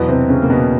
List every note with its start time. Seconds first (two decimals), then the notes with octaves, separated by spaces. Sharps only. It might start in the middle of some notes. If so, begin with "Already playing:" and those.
Already playing: E2 B2 F#3 B3
0.08 C3 C4
0.29 C#3 C#4
0.42 A#3
0.50 B2 B3